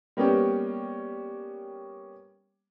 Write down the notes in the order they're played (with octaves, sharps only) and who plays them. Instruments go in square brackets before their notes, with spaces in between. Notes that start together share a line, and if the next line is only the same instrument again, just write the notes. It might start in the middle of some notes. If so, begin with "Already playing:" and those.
[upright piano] G3 A#3 B3 C#4 G4